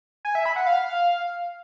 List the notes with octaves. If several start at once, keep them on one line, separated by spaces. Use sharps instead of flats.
G#5
E5
B5
F#5
F5